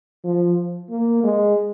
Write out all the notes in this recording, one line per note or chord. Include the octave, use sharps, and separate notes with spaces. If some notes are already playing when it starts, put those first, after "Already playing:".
F3
A#3
G#3